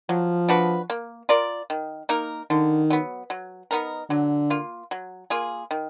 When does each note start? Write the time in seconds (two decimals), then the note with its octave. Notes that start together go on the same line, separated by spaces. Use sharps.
0.09 F3 F#3
0.49 D4 F#4 B4
0.90 A#3
1.29 F4 A#4 D5
1.70 D#3
2.09 A#3 D#4 A#4
2.50 D3 D#3
2.90 F#3 B3
3.30 F#3
3.71 B3 D#4 A#4
4.10 D3 F#3
4.50 A#3 F4
4.91 F#3
5.30 A#3 F4 G#4
5.71 D#3